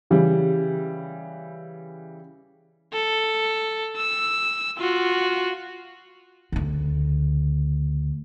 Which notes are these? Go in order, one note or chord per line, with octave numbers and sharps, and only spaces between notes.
C#3 E3 G3
A4
E6
F4 F#4
D2 C#3